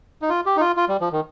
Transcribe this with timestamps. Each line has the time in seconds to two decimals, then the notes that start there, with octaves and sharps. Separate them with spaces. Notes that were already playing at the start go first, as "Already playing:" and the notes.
0.22 D#4
0.30 F4
0.46 G4
0.57 D#4
0.61 F4
0.77 F4
0.89 G3
1.01 F3
1.12 D#3